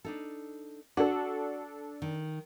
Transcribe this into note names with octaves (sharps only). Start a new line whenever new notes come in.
D4 D#4 A4
D4 F#4 A4
D#3